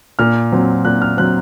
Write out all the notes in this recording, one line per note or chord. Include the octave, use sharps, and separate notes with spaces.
A#2 F6
F#3 C4
A#2 F#6
F6
F#3 C4 F#6